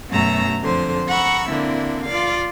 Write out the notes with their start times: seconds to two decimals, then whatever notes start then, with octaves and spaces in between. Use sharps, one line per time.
0.11 F#2 B2 A3 A#5 E6 A#6
0.62 F2 D3 C5 C6
1.10 F#5 A#5 B5 C#6 E6
1.50 D3 A#3 C4 D4 E4
2.06 F4 D5 F5